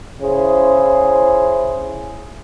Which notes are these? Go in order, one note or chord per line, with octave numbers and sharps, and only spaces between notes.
C#3 E4 G#4 C5